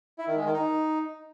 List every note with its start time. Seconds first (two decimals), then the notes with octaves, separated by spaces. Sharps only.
0.18 E4
0.27 D#3
0.36 G#3
0.45 D#3
0.54 D#4